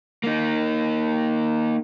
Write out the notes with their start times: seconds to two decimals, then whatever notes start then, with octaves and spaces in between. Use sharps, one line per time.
0.24 A#3 D#4